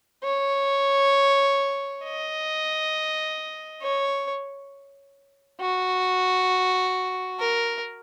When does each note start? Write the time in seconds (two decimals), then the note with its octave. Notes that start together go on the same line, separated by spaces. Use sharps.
0.24 C#5
2.04 D#5
3.83 C#5
5.61 F#4
7.40 A#4